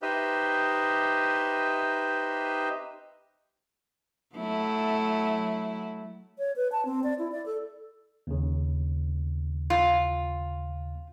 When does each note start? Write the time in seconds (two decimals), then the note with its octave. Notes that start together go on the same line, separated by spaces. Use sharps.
0.02 D#4 G4 B4 C5 D#5 E5
4.35 F#3 A3 E4
6.39 C#5
6.56 B4
6.72 A5
6.85 C4
7.04 D5
7.19 E4
7.32 D5
7.46 A4
8.27 D#2 C#3
9.70 F4